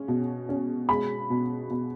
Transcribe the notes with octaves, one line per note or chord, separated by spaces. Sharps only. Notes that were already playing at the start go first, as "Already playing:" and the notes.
Already playing: G#3 C#4
B2
C#4
G#3 B5
B2
B2